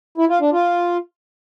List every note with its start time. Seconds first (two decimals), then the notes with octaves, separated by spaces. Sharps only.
0.18 E4
0.29 F4
0.41 D4
0.52 F4